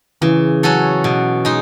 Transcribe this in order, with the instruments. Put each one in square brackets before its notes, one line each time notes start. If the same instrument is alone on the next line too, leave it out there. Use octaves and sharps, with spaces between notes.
[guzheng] C#3 [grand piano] E3
[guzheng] F#3 C#4 F#4 A4
B2
G#3 D#4